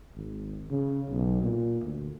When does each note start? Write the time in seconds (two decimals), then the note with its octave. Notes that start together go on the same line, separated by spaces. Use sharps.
0.15 G#1
0.70 C#3
1.10 B1
1.43 A#2
1.84 D2